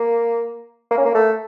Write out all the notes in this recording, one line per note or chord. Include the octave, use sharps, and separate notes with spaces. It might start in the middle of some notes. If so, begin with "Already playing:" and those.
Already playing: A#3
A#3
C#4
A#3
A3